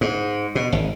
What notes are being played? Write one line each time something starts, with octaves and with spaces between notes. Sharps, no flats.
G#2
B2
G#1